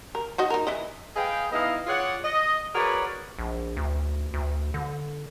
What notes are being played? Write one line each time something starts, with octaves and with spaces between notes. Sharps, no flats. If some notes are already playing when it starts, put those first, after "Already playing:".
A#4
D#4 F#4 D#5
D#4 A#4
E3 E4 D#5
G#4 B4 D#5 F5 G5
B3 D#4 E4 D#5 F5
F4 G#4 C#5 D5 F#5
D#5
F#4 G#4 A#4 B4 C#5 D5
A#1
D2
D2
D3